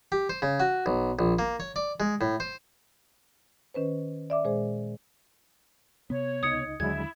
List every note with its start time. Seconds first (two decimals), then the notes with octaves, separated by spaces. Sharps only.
0.12 G4
0.29 C5
0.42 C#3
0.60 F#4
0.86 B1
1.19 A#1
1.39 A#3
1.60 C#5
1.76 D5
2.00 G#3
2.21 A2
2.40 C5
3.74 D#3 C#4 B4 C5
4.30 D5 E5 D6
4.44 A#2 G#3 G#4 C5
6.10 C3 B3 C#5
6.43 C#2 D#4 D#5 D#6 G#6 C#7
6.80 D#2 D3 F#3 G#3 D4 E4 G#6